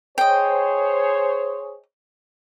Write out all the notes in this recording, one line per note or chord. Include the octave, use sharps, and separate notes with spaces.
G#4 C5 C#5 D#5 G5